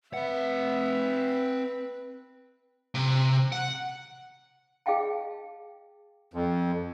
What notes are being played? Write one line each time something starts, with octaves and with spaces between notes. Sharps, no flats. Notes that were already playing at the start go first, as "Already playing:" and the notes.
C4 B4 E5 F#5
C3
F#5
G#4 D#5 F5 G5 A5
F2